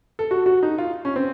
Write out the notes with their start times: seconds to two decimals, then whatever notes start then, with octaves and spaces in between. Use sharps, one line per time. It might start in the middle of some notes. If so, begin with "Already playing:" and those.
0.19 A4
0.31 F#4
0.46 F#4
0.63 D#4
0.78 F4
1.05 C#4
1.16 C4